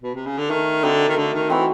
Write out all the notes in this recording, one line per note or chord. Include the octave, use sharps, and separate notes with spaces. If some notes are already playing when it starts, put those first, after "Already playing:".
B2
C3
C#3
D3
D#3 A3
D3 C4 D#4 F#4
D#3
D3 A3
D#3
E3 C4 D#4 F#4